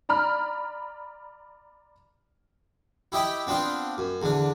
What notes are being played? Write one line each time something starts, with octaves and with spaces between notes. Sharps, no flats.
D5 A#5 B5 F6
E4 G4 D#5 G5 B5
B3 C4 D4 F4 G5
F#2
E2 D3 D4